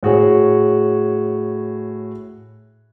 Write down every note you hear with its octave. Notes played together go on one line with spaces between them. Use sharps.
A2 F#4 G#4 C#5